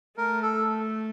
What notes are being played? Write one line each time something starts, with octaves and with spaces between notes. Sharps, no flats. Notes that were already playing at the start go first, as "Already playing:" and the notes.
A3 A#4
A4